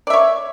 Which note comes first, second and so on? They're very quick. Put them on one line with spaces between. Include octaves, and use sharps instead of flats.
D5 E5 C#5